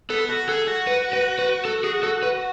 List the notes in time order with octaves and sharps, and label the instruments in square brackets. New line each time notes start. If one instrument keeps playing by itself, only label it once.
[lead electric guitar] B3 [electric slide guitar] A4
[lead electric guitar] F#4
[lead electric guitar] G#4 [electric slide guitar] A4
[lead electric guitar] F#4
[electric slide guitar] B4
B4
B4
A4
G#4
A4
B4